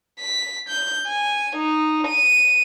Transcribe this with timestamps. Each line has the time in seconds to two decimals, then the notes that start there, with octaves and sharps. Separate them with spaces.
0.20 B6
0.69 G6
1.07 G#5
1.56 D#4
2.07 D#7